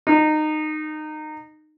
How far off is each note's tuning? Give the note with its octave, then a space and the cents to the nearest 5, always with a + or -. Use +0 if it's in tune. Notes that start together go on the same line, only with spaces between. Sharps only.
D#4 -20